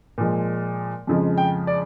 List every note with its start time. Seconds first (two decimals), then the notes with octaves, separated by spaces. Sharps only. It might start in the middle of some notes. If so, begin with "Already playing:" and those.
0.18 A#2 F3 G#3
1.07 F2 C#3 F3 G#3
1.38 G5
1.67 D5